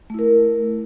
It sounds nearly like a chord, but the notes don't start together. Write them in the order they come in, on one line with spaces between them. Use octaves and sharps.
A3 E4 A#4